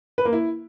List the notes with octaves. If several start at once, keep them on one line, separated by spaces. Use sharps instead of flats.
B4
A#3
E4